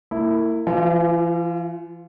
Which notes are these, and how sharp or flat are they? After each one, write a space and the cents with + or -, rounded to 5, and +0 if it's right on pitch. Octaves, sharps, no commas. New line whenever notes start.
A#3 -35 E4 +0
E3 +45 F4 +0